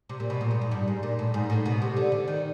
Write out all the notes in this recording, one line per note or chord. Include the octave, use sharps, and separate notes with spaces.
C3
A#2
B2
A#2
G#2
G#2
G2
G#2
A#2
A2
G#2
A2
B2
C3
D3
D3
D#3